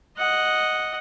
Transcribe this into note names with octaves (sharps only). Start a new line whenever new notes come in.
D#5 F#5